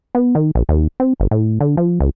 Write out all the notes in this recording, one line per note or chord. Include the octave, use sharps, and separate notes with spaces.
B3
D#3
A#1
D#2
C4
G1
A2
D3
F3
C#2